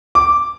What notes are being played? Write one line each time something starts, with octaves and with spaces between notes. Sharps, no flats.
D6